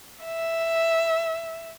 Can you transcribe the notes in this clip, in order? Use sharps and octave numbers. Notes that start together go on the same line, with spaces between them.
E5